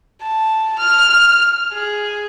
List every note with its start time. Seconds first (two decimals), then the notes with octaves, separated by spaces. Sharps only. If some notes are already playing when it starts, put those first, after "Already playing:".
0.22 A5
0.79 F6
1.73 G#4